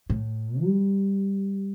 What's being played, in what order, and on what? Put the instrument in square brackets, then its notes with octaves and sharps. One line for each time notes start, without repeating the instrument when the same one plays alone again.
[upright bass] A2
G3